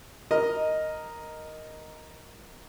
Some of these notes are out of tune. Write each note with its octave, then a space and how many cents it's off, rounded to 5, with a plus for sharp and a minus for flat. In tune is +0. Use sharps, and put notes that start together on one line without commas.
A#4 +0 D#5 +0